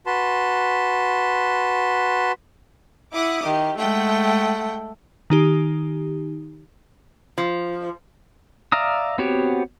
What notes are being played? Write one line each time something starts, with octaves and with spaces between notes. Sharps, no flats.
F#4 B4 A5 C6
E4 F#5 D6 D#6
D#3 G4
G#3 A3 F#5 G5
D#3 D#4 G4
F3
D5 E5 F5 A#5 D#6
B3 C4 F#4 G4 C#5